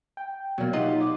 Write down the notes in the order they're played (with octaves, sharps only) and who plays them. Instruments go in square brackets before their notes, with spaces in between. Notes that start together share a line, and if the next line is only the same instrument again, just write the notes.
[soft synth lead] G5
[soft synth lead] B2 [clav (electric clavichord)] F#3 A#3 [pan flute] D5
[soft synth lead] D#4 [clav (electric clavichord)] F4 D#5 F#5 [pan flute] G4
[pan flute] D6